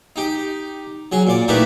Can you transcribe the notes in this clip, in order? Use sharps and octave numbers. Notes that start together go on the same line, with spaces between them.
D#4 G4
F#3 G#4
A#2 D5
A3 A#3 D#4 E4 G4 B4